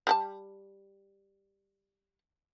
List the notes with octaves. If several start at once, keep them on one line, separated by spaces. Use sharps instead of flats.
G3 A4 A5